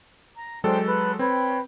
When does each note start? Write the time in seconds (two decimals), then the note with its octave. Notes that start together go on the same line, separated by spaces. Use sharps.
0.36 A#5
0.64 F#3 G#3 D4 A4 C5 G5
0.86 B4
1.19 C4 B4 C#5 G5